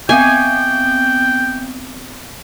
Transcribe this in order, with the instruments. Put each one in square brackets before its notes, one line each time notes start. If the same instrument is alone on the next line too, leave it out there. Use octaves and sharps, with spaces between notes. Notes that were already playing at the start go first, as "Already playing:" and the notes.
[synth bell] B3 C4 [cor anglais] G5 [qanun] G#5